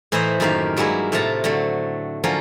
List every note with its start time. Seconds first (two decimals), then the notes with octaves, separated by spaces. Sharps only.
0.12 A2 E3 E4 C5 D#5 A#5
0.40 F#2 A2 D#3 A#3 G4 F5
0.76 G2 F#3 G#3 A#3 E4
1.12 A2 C3 A3 F4 A5 A#5
1.44 D3 F#3 A3 C4
2.24 D3 F3 F#3 A#3 C#4 F4